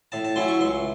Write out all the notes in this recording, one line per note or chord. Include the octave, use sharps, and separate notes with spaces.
A2 A5
A5
F#3 C#4 E4 C6
C#6
C#2 C6